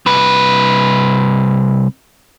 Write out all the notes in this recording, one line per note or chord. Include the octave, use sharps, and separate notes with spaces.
C2 B4